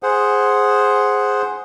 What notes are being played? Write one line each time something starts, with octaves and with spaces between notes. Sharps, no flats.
G#4 C5 F#5